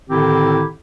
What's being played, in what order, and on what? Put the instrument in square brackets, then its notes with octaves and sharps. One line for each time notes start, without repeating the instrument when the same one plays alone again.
[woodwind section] A2 D3 D#3 C4 E4 G4